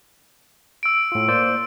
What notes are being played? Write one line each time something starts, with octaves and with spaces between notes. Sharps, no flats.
E6 D7
A2 F4
A#3 C5 D5